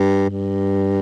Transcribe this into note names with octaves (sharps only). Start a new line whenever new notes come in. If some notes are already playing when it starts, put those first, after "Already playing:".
Already playing: G2
G2